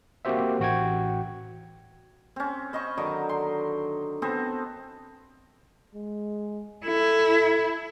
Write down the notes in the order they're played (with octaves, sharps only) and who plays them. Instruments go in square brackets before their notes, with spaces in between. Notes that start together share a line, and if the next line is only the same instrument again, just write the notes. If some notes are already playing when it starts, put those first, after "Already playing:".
[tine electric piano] A#3 C4 F#4 G4 C5 E5
A1 F#4 G5 G#6
[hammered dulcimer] C4 C#4
C5 D#5 B5 C#6
D3 D#3 F#3
C6
B3 C4 A4 C5
[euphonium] G#3
[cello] E4 [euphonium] A4